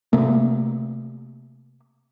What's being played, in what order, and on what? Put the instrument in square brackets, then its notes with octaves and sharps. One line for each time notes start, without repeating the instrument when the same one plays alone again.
[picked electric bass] C3 A3 A#3